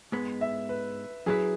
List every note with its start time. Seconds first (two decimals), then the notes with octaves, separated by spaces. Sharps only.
0.12 G#2 G#3 B3
0.41 E5
0.69 B4
1.26 F#2 F#3 E4 G#4 B4